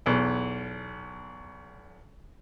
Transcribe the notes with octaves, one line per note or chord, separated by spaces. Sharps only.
B1 E2